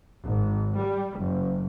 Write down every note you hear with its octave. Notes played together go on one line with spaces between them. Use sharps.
G#1
G3
F#1